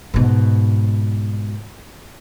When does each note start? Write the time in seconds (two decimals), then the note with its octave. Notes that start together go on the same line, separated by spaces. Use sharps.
0.14 G#2 B2